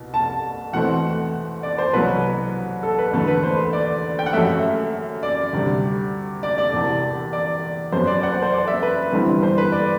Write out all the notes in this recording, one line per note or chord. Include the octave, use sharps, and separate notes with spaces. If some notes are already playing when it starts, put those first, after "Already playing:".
Already playing: C2 B2
A5
E2 B2 A3 C4 F#5
D5
C5
C2 B2 F#3 B4
A4
B4
E1 D2 D3 A3 A4
B4
C5
D5
G5
F#5
F#2 F#3 A3 E5
E5
E5
D5
D2 C3 G3
D5
D5
E1 E2 C3
D5
F#2 F#3 B3 C5
D5
F#5
C5
C5
D5
E5
B4
G1 G2 E3 G3 C4
C5
B4
D5